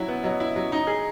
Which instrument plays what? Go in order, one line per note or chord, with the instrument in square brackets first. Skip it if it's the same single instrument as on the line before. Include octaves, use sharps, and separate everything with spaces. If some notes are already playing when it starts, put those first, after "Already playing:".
Already playing: [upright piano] F#3 E4
B3
[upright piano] F#3 [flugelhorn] D#5
[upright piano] E4
F#3
D#4
G#4